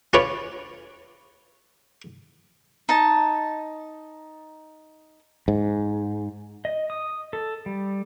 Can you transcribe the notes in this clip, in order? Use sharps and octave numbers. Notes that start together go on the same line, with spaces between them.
C#4 D4 F4 B4 C#5 D5
D#4 A5
G#2
D#5
D#6
A4
G3